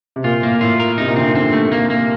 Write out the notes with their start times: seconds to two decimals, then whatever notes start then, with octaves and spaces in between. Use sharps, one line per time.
0.16 C3
0.24 A#2 F4
0.43 A2 A#3
0.61 A2 F4
0.80 A#4
0.98 C3 D#4
1.08 A#2
1.16 D3 C4
1.26 D#3
1.35 D3 C4
1.53 A3
1.72 A#3
1.90 A#3